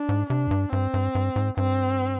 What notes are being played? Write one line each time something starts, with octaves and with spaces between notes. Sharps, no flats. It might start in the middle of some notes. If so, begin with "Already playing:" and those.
Already playing: D4
G#2
C3 D4
F2
G2
G2 C4
G2
G2
G#2
G2 C4